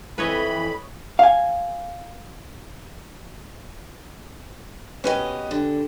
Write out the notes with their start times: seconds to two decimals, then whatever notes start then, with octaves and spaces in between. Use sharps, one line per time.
0.18 F2 E3 B4 C#5 D#5 B5
1.19 F5 G#5
5.04 B2 C#4 G4 B4 D#5 G#5
5.51 D3